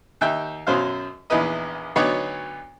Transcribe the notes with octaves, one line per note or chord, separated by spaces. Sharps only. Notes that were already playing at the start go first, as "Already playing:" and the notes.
D#2 D#4 E5 G5
F#2 B2 F#3 C5 F5
A#1 E2 D#4 E4 B4 D#5
D2 F#3 B3 D#4 C#5 D5